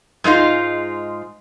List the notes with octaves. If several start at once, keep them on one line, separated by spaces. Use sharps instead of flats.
G#2 G#3 D#4 F4